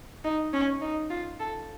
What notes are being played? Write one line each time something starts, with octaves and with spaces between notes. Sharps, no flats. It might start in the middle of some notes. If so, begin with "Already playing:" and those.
D#4
C#4
D#4
F4
A4